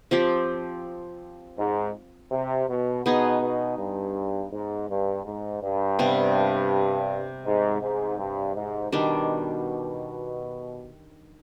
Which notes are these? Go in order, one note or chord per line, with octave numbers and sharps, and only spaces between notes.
F3 C4 G4
G#2
C3
B2
B2 B3 D#4 G#4
B2
G2
G#2
G2
G#2
G2
C3 G3 B3
G#2
G#2
G2
G#2
B2 D#3 G3 D4